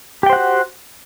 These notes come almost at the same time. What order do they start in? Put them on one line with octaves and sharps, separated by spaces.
G4 G5 C5 F#5 F#4